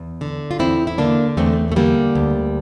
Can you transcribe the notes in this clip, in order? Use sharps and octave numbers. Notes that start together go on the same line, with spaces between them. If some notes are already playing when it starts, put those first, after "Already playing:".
Already playing: E2
D3
F4
E2 C4 E4
E4
D3 A#3 D4
E2 A3 C4
A3
D3 G3 A#3
D2